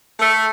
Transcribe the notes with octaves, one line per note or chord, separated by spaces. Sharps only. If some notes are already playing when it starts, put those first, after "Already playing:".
A3